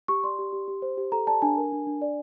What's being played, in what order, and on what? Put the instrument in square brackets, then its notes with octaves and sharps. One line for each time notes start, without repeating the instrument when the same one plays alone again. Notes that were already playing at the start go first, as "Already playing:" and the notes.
[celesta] G4 C#6
D5 C6
G4
G4
G4
C5
G4
A4 A#5
D5 A5
D4 G#5
A#4
D4
D4
D5